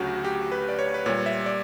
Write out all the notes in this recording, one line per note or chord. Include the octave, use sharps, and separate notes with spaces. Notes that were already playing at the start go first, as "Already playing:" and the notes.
Already playing: D2 C#3 F#3 F#4 G4
G4
B4
D5
C#5
B4
A#2 G3 C#5
E5
D5